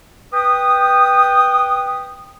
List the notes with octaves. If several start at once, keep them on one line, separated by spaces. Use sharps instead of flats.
B4 G5 D#6